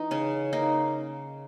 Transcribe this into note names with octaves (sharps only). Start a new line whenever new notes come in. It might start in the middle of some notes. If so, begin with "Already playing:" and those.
Already playing: E3 D#4
C#3 C#4
A#3 D#4